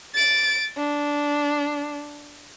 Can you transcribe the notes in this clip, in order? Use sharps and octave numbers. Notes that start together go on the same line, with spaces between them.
A6 D7
D4